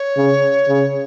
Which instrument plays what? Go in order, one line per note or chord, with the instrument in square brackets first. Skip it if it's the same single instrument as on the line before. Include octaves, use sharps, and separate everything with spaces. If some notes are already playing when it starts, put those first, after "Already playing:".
Already playing: [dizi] C#5
[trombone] C#3
C#3